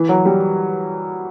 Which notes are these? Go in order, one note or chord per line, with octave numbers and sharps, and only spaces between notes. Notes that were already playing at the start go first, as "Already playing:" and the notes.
Already playing: E3
F#3
G3